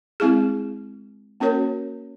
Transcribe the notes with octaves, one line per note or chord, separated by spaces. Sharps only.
G#3 C4 E4 G#4
A#3 C#4 F#4 A#4 C#5